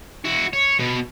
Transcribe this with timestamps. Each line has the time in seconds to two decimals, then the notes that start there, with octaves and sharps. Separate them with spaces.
0.25 E4 F#4
0.53 C#5
0.79 B2 B3